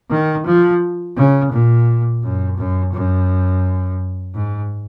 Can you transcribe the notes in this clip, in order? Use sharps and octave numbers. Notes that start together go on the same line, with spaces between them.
D#3
F3
C#3
A#2
F#2
F#2
F#2
G#2